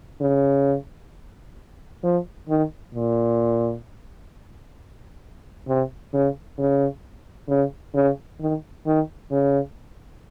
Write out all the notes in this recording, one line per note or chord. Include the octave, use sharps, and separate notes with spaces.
C#3
F3
D#3
A#2
C3
C#3
C#3
C#3
C#3
D#3
D#3
C#3